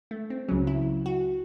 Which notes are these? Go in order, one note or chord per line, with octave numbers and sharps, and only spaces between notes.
A3
C4
C#2 C#3 F#3 C#4
E4
F#4